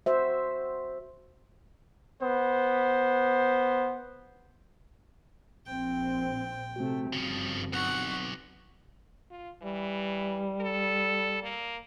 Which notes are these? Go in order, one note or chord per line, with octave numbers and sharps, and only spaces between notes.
F#4 C5 E5
B3 C5
A#1 C4 G5
C3 A3 C4 F#4
G1 G2 C#3 F3
B1 F#5 C#6
F4
E3 G3
A4
A#3